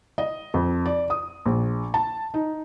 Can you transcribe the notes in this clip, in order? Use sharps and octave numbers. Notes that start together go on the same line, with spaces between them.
D#5
F2
D5
D#6
A#1
A5
D#4